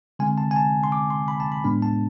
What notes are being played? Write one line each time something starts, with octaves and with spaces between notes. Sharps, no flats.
D3 G#3 C4 G#5
A5
G#5
A5
C6
D6
C6
B5
A5
B5
A2 G#3 B3 D4
A5